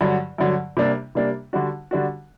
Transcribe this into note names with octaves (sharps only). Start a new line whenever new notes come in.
G2 D3 F#3
G2 D3 F#3
C3 G3 A#3 D4
C3 G3 A#3 D4
D3 G3 D4 F#4
D3 G3 D4 F#4